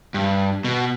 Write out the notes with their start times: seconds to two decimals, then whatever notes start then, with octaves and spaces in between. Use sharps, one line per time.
0.14 G2
0.64 B2